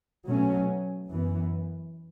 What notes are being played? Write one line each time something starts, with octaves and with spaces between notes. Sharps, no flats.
B2 F#3 A3 C#4
F#2 E3 B3